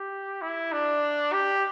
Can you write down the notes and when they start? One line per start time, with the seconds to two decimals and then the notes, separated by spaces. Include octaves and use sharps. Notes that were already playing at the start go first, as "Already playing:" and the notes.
Already playing: G4
0.42 E4
0.72 D4
1.33 G4